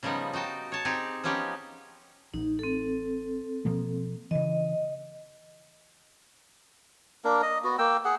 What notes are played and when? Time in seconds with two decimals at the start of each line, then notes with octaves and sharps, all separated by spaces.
0.03 C#3 F3 G3 B3 D#4
0.33 D#4 F#4 G5 A5
0.72 C#5 A5
0.85 C4 D#4 G4 G#4
1.24 F3 B3 C#4 D#4 G4
2.34 A1 D#4
2.59 C4 A4
3.65 B2 F3 A#3
4.31 C#3 E3 D#5
7.25 A#3 D4 A#4
7.43 D#5
7.64 B3 F#4
7.79 A#3 G5 E6
8.05 G#4 F#5